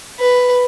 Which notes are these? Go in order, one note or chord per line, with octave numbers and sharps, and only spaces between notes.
B4